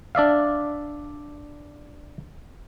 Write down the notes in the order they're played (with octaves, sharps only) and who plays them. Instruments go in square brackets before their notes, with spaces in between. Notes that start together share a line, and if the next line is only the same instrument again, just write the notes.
[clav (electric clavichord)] D4 D5 E5 F5